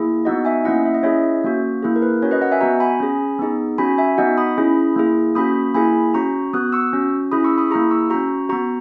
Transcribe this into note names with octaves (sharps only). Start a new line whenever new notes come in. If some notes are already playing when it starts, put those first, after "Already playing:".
Already playing: A#3 E4 G#4
B3 D#4 F#4 D#5 F#5
E5 G#5
A#3 C#4 E4 D#5 F#5
E5
D#5
C#4 E4 G#4 C#5 E5
A#3 C#4 F#4
A#3 E4 G#4
A#4
B4
C#4 F#4 A#4 C#5
B4 D#5
D#5 F#5
E5 G#5
B3 F#4 F#5 A#5
G#5 B5
C#4 G#4
B3 D#4 G#4
C#4 F#4 G#5 B5
E5 G#5
B3 D#4 F#4 D#5 F#5
B5 D#6
C#4 E4 G#4
A#3 E4 G#4
A#3 C#4 F#4 B5 D#6
A#3 E4 G#4 G#5 B5
C#4 F#4 A#5 C#6
B3 F#4 D#6 F#6
C#6 E6
C#4 F#4
C#4 E4 G#4 B5 D#6
C#6 E6
B5 D#6
A#3 E4 G#4 A#5 C#6
C#6 E6
C#4 F#4 A#5 C#6
B3 F#4 A#5 C#6